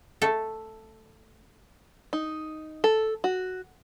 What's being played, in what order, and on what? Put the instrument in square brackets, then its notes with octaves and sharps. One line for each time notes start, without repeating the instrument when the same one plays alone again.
[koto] A3 A4
[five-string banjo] D#4
A4
F#4